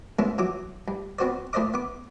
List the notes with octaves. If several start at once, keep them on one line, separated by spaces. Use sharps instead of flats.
G#2 G#3 A3 B3 C#4 E4
E3 F#3 D6
G2
B3 C4 F#4 C5 D5
A2 A3 C5 D5 D#5 D6
B3 D6